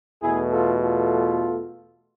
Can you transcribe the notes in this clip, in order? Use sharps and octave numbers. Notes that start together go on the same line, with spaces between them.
E2 B2 A3 E4 G#4
F4 A4
F4 A4